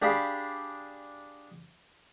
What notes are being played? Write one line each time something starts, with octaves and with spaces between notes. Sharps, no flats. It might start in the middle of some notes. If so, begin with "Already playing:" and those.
D4 G4 G#4 D5 F5 B5